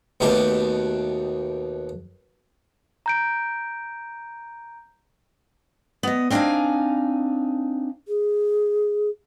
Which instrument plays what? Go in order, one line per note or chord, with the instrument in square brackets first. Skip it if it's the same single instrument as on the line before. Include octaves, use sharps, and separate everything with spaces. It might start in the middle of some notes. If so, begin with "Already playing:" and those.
[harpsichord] D#2 B2 D#3 A3 G4 B5
[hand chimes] A#5 G6 D7
[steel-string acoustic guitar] B3 D#5
C4 D4 D#4 D#5 F5 G#5
[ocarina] G#4